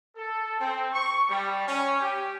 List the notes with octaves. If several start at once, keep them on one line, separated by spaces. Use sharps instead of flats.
A4
C4
C#6
G3
C#4
G4